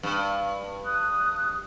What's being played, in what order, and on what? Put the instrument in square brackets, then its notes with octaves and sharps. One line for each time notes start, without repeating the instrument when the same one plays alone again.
[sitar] G2
[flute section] D#6 F#6